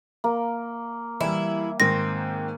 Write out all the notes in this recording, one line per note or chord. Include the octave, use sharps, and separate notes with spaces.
A#3
E3 G3 E4
G#2 D#3 C4 A#6